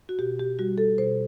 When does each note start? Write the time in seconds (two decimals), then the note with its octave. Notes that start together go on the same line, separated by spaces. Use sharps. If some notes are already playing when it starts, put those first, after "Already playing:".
0.09 F#4
0.19 B2 G4
0.40 G4
0.59 G3 F#4
0.78 A4
0.98 B2 C5